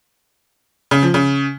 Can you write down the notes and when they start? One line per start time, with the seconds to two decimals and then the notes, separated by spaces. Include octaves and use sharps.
0.91 C#3
1.03 F3
1.14 C#3